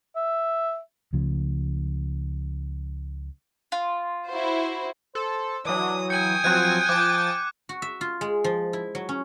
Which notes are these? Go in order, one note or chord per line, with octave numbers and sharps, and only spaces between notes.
E5
C#2 C#3 F3 A3
F4
E4 F#4 C5
A4 C5
E3 F#3 D4 D#6
G5 G#5 D#6 C#7
F3 F#3 C4 F#6 G#6 D#7
F3 D6 A6
F#4
E5
F4
G#3
F3
E4
F#3
C#4